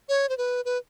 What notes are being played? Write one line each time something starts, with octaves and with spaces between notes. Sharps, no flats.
C#5
C5
B4
B4